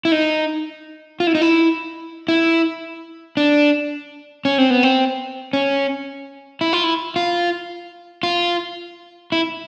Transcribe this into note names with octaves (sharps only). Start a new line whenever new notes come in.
E4
D#4
F4
E4
D#4
E4
E4
D4
C#4
C4
B3
C4
C#4
E4
F4
E4
F4
F4
E4